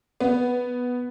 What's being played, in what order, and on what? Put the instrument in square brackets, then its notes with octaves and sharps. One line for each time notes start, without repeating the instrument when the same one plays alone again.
[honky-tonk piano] B3